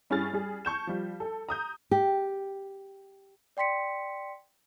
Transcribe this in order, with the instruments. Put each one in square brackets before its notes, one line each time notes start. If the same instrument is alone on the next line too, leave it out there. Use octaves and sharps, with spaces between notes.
[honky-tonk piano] G2 C#4 E4 G#4 F6 A6
G3 G#4
A5 C#6 G6 E7
F3 G3
A4
A#5 D#6 G6
[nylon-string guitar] G4
[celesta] D5 G5 C6 B6 C#7